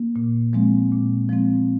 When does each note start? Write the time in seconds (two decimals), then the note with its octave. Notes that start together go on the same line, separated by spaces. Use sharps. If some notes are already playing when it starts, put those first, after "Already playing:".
Already playing: A#3
0.16 A#2
0.53 F3 G#3 C4
0.92 A#2
1.29 F3 G#3 C4